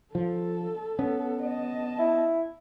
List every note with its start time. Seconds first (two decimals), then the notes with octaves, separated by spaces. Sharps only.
0.15 F3 A4
0.99 B3 C#4
1.42 D#5 A5
1.99 E4